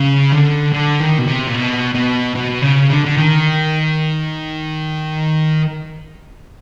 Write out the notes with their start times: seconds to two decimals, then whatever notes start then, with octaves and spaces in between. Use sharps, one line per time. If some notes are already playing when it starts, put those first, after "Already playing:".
Already playing: C#3
0.32 D3
0.73 D3
1.00 D#3
1.18 B2
1.27 C3
1.47 A#2
1.54 B2
1.95 B2
2.36 B2
2.62 C#3
2.90 D3
3.05 D3
3.17 D#3